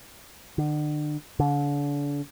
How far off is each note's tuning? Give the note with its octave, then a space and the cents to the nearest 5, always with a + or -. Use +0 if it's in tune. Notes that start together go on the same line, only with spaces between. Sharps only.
D3 +40
D3 -35